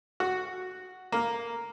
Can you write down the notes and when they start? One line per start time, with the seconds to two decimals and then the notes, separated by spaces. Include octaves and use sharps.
0.20 F#4
1.12 A#3